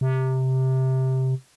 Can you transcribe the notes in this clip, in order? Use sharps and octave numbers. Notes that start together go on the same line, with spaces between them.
C3